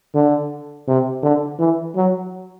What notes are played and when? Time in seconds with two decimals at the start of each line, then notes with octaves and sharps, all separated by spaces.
0.14 D3
0.87 C3
1.23 D3
1.59 E3
1.96 F#3